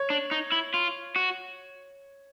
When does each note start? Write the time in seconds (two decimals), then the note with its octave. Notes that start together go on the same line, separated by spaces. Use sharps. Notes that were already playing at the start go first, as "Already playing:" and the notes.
Already playing: C#5
0.10 D4
0.31 D#4
0.52 E4
0.74 F4
1.16 F#4